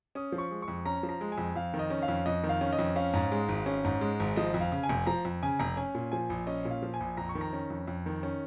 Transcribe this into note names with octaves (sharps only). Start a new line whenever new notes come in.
C#4 D#6
F3
C#6
G#3
C#6
F2
C#4 A#5
F3
A#5
G#3
G#5
F2
F2 F5
D#3
D#5
C#4
F5
F2
F2 D#5
D#3
F5
C#4
D#5
F2
C#4 F5
G#2
G#3
G#1
C#4
G#2
G#3
G#1
F3 D#5
F2
F5
C#3
G#5
F1
F3 A#5
F2
C#3 G#5
F1 A#5
C#4 G#5
A#2
F3 G#5
A#1
C#4 D#5
A#2
F5
F3
G#5
A#1
F2 A#5
C#6
D#3
A#5
C#4
F2
F2
D#3
C#4